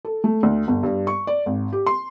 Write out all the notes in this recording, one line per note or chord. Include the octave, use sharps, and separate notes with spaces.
A4
A3
D2
G1
G2
C#6
D5
G#1
G4
C6